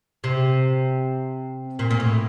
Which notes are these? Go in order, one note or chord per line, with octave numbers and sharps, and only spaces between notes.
C3
A#2
A#2
A2